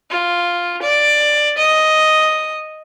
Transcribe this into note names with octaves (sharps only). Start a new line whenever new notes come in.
F4
D5
D#5